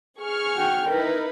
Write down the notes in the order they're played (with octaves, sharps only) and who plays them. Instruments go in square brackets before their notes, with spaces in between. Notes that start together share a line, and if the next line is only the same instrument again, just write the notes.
[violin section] G#4 C#6 F6
[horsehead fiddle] F#4 G5
[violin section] D#4 E4 B4 [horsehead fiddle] A#4